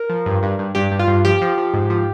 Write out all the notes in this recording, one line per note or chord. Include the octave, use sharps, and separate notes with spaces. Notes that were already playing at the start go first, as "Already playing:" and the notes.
Already playing: A#4
F3
G2
G2
G2
G2 G4
G2
F4
G2
F3 G4
F3
F3
G#2
F3